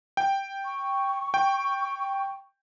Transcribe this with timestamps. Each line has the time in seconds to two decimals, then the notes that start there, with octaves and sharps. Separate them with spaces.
0.17 G5
0.64 C#6
1.34 G5